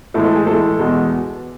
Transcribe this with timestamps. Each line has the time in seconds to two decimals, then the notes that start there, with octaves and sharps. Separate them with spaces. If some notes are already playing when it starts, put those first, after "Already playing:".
0.14 A2 E3 G#3 A4
0.25 A4
0.36 G#4
0.47 A2 E3 G#3 A4
0.79 E2 B2 G#3